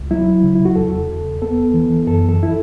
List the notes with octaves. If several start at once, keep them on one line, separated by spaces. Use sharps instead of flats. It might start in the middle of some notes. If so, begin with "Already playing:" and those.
Already playing: C#2
F#3 E4
C#3
E4
F#4
E2 A4
E2
B3 A4
E3
F#2 A4
A4
E4